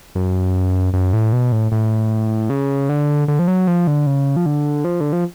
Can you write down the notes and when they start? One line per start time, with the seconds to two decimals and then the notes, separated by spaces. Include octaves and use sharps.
0.15 F#2
0.93 F#2
1.13 A2
1.33 B2
1.52 A2
1.72 A2
2.50 C#3
2.89 D3
3.28 D3
3.39 F3
3.48 F#3
3.67 F3
3.87 D3
4.07 C#3
4.36 F3
4.46 D3
4.85 F3
5.01 D3
5.13 F3